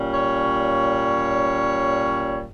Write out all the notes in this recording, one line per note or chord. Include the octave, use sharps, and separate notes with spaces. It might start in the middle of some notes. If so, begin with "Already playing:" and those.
Already playing: A#2 G3 C#4
C#5